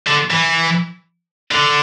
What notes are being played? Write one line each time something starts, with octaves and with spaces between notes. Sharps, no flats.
D3
E3
D3